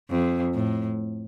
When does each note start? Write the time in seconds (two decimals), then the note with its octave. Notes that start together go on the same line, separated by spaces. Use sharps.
0.10 F2
0.54 A2